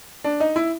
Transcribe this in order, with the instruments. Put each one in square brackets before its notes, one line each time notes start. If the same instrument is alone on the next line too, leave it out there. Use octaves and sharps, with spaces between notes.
[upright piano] D4
D#4
E4